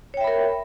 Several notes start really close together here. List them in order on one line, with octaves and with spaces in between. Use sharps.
C#5 G5 E5 B5 A#4